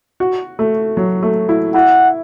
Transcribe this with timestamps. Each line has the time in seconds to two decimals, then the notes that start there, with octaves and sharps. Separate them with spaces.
0.20 F#4
0.59 A3
0.97 F#3
1.23 A3
1.49 E4
1.74 E4 F#5